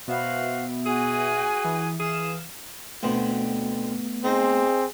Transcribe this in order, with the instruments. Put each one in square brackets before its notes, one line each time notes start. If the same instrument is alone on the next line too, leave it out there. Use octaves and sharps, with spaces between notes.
[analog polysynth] B2 B3 E5 [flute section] F#4 C5 F5
[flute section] F#4 G#5 [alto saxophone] G#4
[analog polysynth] E3
[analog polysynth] E3 F5 E7 [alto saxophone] G#4
[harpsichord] D2 B2 C4 [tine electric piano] A3 B3
[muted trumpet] C4 [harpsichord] D#4 C5 [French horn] G#4